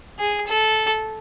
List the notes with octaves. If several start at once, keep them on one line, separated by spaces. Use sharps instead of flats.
G#4
A4